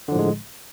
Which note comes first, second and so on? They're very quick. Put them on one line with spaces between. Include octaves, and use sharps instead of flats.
D3 F3 A2 G#3